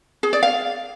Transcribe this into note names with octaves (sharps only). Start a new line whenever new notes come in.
G#4
D5
F5